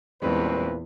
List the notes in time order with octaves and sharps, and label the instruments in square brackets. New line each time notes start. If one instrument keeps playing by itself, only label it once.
[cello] E2 [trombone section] A#2 C4 B4 [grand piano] G3 G#3 C#4